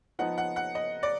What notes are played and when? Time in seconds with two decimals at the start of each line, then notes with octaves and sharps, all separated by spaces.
0.19 F3 B3 D#4 F#5
0.38 F#5
0.56 F#5
0.75 D#5
1.03 D5